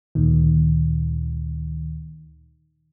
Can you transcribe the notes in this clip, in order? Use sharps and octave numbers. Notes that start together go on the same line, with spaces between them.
D2 A#2 D#3